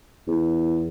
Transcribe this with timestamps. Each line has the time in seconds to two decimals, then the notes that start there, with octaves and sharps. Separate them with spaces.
0.27 E2